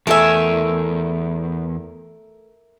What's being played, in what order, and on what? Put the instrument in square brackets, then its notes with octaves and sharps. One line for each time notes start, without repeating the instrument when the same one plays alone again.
[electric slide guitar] E2 [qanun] A3 A4 G#5 [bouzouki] A#4 E5